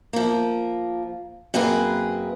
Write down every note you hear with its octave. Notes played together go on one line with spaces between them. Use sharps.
F3 A#3
F#2 A#3 C4 G#4 B4